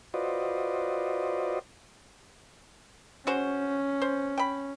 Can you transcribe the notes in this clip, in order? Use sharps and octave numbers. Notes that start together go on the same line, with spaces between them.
F4 F#4 B4 C5 D5 D#5
C#4 F#4 G#4 C5
C5
G5 B5